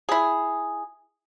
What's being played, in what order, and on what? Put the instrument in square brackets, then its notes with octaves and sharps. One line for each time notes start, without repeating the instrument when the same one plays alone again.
[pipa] E4 G#4